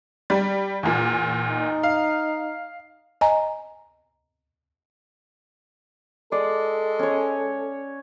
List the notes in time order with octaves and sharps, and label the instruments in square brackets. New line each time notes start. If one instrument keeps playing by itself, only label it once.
[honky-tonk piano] G3
E2 A#2
[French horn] D#4
[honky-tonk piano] F5
[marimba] D#5 G#5 A#5
[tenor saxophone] G#3 [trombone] A4 [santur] D5
[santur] C#4 C#5